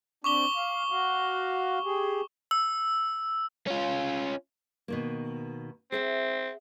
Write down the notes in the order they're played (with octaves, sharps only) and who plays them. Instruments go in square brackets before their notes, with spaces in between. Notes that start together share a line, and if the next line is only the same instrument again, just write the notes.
[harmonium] C4 D4 [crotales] C#6 D6 G7
[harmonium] F5
F#4 F5
G4 G#4
[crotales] E6
[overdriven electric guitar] C#4 F4
[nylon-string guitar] B2 D#3 A#3
[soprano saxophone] C4 [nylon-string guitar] G#4 E5 F#5